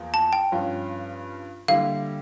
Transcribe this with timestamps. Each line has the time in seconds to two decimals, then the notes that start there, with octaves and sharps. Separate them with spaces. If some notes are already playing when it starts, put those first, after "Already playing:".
Already playing: E2 F3 A#3
0.14 A5
0.33 G5
0.52 G2 F3 C#4 F4
1.68 D3 G3 A#3 E4 F5